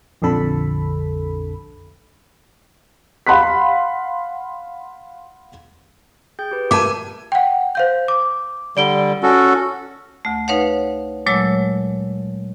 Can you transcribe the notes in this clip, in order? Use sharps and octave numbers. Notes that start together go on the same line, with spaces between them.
A#1 F2 D3 A4 B5
F5 F#5 B5 C6 F#6 B6
G#4 G5 G6
G4 B4
A#4 E5 G#5 A5 D6
F#5 G5
C5 F5 G6
D6
D3 G3 D5 D7 G7
C#4 F#4 A4
D2 A3
D#4 B4 C#5 F5 F#5
A#2 F#3 G#3 A3 C#5 E6